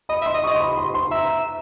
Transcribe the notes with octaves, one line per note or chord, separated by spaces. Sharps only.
D#5 B5
E5
C6
D#5
C#6
D#5
C6
B5
C6
C6
E5 A#5